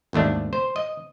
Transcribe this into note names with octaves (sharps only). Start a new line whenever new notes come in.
G#1 D#2 A3 D4
C5
D#5